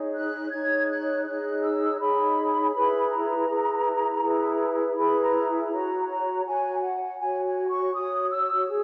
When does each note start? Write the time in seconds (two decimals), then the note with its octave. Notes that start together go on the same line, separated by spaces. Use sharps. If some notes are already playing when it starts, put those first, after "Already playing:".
Already playing: D#4 G#4 C#5
0.15 F#6
0.51 D#4 G#4 C#5 G#6
0.89 F#6
1.26 D#4 G#4 C#5 F#6
1.63 E6
2.00 D#4 G#4 C#5 B5
2.74 E4 G#4 B4 B5
3.11 A#5
3.49 E4 G#4 B4
4.23 E4 G#4 B4
4.97 E4 G#4 B4 B5
5.21 A#5
5.71 F#4 C#5 A#5
6.09 A#5
6.45 F#4 C#5 G#5
6.83 F#5
7.20 F#4 C#5 G#5
7.45 G#5
7.69 C#6
7.94 F#4 C#5 D#6
8.31 E6
8.68 G#4